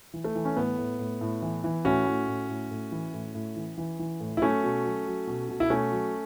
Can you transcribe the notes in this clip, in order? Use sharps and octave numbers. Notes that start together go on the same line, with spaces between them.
E3
A3
E3
C#4
A2 B3
A2
A2
A2
E3
E3
A2 C#4 F#4
A2
A2
A2
A2
E3
A2
A2
E3
E3
E3
A2
E4
F#3 A3 C#4
B2
F#3
F#3
B2
B2
E4
B2 A3 C#4
F#3